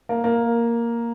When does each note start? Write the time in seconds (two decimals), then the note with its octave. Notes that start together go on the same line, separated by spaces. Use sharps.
0.09 A#3
0.24 A#3